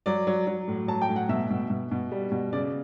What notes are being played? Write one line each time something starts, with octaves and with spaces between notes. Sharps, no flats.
F#3 D5
F#3
F#3
A2
F#3 A5
G5
A2
F#5
B2 E5
B2
B2
B2
G3
B2
C#3 D5